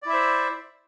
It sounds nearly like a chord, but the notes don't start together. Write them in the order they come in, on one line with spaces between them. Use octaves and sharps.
D5 E4 E5 C5